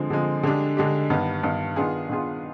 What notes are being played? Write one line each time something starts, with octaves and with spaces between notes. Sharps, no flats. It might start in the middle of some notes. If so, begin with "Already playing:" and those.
Already playing: D3 F3 G#3 C4
D3 F3 G#3 C4
D3 G#3 D4 G4
D3 G#3 D4 G4
G2 D#3 B3
G2 D#3 B3
D#3 B3 D4 F4 G#4
D#3 B3 D4 F4 G#4